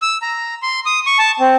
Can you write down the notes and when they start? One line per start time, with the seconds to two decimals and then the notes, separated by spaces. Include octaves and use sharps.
0.02 E6
0.22 A#5
0.62 C6
0.86 D#6
1.07 C#6
1.19 A5
1.40 C4